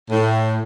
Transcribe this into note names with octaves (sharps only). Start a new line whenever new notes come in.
A2